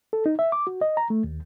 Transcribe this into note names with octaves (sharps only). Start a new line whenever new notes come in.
A4
D#4
E5
D6
F#4
D#5
A#5
A3
D#2